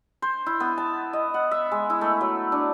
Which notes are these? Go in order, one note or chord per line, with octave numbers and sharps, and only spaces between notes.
C5
E4
B3
A5
D#5
F#5
E5
G#3
E4
A3
F#3
D4